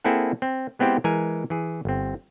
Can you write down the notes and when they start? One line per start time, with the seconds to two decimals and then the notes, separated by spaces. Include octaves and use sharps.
0.04 A#3 C4 E4 G#4 A4 F#5
0.42 C4
0.79 G#3 B3 C4 E4 G4 C5
1.04 E3 G#3 A#4 G#5
1.50 E3 G#4
1.85 G1 C4